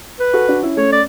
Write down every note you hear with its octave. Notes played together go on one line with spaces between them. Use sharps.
B4
F#4 A4
D4 F#4
C#4 E4
A3 C#4 C#5
D5